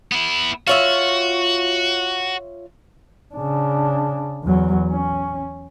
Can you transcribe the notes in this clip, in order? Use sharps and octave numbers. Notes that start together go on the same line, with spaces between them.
B3 E4
F4 F#4 C#5 E5
C#3 D4
E2 F#3
C#4